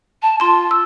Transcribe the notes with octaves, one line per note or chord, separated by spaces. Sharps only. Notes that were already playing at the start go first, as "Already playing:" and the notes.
A5
F4 A5 C6
E6